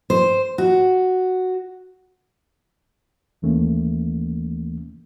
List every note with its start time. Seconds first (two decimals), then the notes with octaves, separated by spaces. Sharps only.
0.10 C5
0.58 F#4
3.42 D#2 E3 A3 A#3 C#4